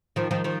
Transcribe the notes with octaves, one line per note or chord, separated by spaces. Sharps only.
D#3 F3
D#3 F3
D#3 F3